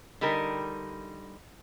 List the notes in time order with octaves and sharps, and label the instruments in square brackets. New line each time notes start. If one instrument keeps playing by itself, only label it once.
[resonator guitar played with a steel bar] D3 G3 D#4 A#4